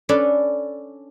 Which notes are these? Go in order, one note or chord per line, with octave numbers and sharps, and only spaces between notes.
C#4 D4 A4 B4 D5